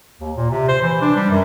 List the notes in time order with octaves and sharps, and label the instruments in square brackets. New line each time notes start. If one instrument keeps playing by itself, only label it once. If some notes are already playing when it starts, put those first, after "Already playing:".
[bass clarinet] D#2
A#2
C3
C5
E3
D4
G3
F#2